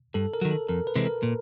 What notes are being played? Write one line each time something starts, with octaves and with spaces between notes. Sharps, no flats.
G2 A4
A#4
D#3 F#3
A4
F2 A#4
B4
C3 E3 G#3 C4
A#4
A#2